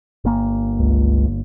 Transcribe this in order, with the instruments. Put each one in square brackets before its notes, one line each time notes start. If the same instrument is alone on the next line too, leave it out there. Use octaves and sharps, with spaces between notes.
[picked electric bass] G1 A#3
[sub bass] C#2